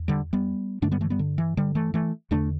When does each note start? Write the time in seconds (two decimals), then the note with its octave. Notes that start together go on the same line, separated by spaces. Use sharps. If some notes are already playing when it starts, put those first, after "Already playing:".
Already playing: E2
0.08 D3 G3
0.33 G3 B3
0.82 G2 D3 A3 D4
0.92 G3 B3
1.01 E3 A3
1.10 G3 B3
1.19 D3
1.38 E3
1.57 D3 G3
1.75 E3 A3
1.94 E3 A3
2.31 E2 D3 A3 D4